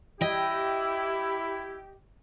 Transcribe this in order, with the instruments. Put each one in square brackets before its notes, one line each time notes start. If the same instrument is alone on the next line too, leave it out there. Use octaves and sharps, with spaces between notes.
[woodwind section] E4 [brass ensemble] G4 [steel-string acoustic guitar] D#5 G5